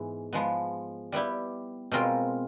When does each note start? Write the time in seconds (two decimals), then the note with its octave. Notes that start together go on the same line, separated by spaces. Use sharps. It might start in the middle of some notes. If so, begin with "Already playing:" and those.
Already playing: G#2 E3 G#3 B3
0.33 F3 G#3 B3
1.12 G3 B3 E4 G4
1.91 B2 G#3 C4 F4 A#4